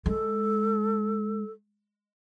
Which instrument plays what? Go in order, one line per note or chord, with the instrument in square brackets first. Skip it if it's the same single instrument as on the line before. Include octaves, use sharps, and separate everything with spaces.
[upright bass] G#3 [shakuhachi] A4